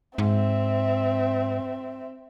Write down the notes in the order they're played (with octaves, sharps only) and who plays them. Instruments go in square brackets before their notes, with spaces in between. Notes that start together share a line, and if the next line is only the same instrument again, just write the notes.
[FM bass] G#2 [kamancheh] C4 E5